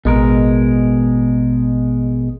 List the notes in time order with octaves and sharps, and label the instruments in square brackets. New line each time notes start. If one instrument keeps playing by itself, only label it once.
[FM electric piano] A1 [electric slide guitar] B2 G#3 A#4